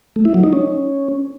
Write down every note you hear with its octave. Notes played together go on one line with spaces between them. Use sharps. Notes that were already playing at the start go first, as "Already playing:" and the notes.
A3
E4
F#3
D#4
C#4